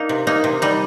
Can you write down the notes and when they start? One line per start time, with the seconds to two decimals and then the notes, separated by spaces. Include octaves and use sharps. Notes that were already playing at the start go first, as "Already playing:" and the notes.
Already playing: A#3 D#4
0.09 C3
0.27 A#3 D#4
0.44 C3
0.62 G3 D#4